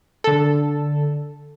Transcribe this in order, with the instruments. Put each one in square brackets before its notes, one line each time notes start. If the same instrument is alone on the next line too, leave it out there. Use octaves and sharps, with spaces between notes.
[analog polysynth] D3 A4